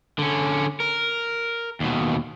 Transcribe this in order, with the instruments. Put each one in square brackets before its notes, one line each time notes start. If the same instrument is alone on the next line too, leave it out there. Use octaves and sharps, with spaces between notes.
[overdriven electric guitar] D3 C#4
A#4
D#2 B2